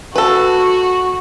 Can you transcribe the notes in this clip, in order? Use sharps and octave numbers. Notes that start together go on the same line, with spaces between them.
F#4 A4 B4